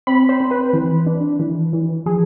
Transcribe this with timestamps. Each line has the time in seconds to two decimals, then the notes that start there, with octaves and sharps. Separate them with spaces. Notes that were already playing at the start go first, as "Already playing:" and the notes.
0.07 C4 B5
0.29 C5
0.40 C4
0.51 B4
0.73 E3
1.06 D4
1.39 E3
1.73 E3
2.06 F3 G#4